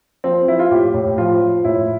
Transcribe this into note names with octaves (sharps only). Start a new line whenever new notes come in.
F3 C4
F3 E4
F4
A2 G4
A2
F3 F4
F3
A2 E4